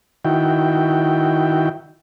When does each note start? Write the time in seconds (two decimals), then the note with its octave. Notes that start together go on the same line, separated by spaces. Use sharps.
0.25 D#3 E4 F#4 G5